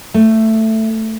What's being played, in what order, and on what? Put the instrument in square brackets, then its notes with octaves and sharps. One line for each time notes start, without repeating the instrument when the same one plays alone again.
[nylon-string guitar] A3